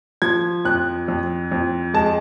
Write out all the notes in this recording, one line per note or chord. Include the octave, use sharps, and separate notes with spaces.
F3 G#6
F2 F#6
F2
F2
G#3 A5